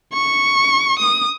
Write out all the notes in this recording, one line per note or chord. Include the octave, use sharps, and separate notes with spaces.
C#6
D#6